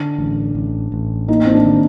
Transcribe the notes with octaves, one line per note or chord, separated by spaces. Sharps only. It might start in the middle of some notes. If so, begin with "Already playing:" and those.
Already playing: D3 D4
A1
A1
A1
A#3 D#4
C4
D4
D#3